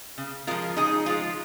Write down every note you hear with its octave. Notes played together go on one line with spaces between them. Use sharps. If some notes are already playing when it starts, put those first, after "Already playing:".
C#3
F3 G#3 F4 A#4
C#3 D#4 G#4
F3 G#3 F4